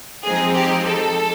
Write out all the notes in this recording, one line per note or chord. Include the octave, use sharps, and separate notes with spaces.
F3 G#3 C4 D#4 G#4
G4
A4